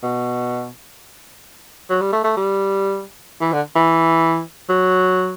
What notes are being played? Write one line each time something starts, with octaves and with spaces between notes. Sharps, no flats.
B2
F#3
G3
A3
A3
G3
E3
D3
E3
F#3